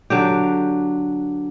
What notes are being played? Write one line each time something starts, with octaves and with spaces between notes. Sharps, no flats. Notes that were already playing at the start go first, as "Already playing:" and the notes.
D3 F#3 G4